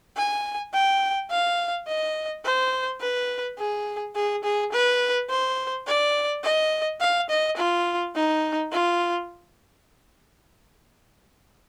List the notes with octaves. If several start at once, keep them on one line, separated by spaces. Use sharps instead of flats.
G#5
G5
F5
D#5
C5
B4
G#4
G#4
G#4
B4
C5
D5
D#5
F5
D#5
F4
D#4
F4